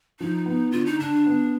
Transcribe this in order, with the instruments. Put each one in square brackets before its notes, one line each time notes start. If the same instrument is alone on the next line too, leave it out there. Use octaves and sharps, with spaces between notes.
[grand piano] F3 [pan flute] D#4
[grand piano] B3
[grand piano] D3 [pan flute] F4
[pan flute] D#4
[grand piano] D3 [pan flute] D4
[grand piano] B3